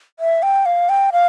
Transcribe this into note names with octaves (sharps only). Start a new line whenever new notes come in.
E5
G5
F5
G5
F5